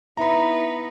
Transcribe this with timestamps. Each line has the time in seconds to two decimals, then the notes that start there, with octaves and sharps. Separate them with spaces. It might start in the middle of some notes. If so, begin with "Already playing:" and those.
0.17 B3 D#4 E4 B4 E5 A#5 B5